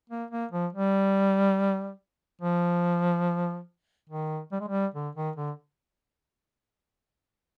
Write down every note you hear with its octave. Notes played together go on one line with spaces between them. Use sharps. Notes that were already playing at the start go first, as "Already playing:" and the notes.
A#3
A#3
F3
G3
F3
D#3
G3
G#3
G3
D3
D#3
D3